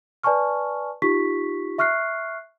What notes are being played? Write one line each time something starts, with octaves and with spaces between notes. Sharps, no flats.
B4 D5 G#5 A5 C#6 F6
D#4 F4 G4 C#6 B6
E5 C#6 F6 F#6 C7